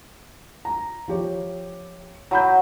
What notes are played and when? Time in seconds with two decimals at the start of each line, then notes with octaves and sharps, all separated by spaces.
0.65 A#5
1.08 F3 G4 C#5
2.31 F#3 A#5 B5 G6